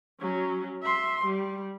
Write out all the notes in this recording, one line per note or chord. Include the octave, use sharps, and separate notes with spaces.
F#3 C#4
E5 C6
G3